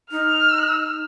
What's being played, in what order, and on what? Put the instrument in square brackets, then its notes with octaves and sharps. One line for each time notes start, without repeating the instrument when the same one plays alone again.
[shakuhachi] D#4 [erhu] F6